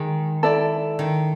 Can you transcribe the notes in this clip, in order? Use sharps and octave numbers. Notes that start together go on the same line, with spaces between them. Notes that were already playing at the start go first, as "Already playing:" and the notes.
Already playing: D#3 G#3
E4 A4 D5
D#3